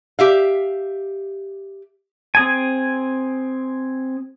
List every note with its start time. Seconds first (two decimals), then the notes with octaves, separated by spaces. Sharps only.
0.19 G4 E5 F5
2.35 C4 G#4 G#5